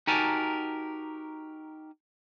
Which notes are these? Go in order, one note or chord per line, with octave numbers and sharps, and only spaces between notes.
D#4 F#4 G4 A#4 G#5 A5